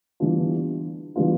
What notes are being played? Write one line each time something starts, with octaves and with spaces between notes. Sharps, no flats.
E3 G3 B3 D4 F4
E3 G3 B3 D4 F4